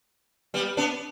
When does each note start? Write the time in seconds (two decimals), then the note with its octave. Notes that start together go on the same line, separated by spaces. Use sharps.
0.54 G3 B3
0.77 B3 D4